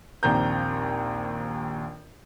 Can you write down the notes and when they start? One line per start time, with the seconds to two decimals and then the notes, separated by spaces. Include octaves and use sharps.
0.23 A#1 D#2 A#3 C4 A#5 G6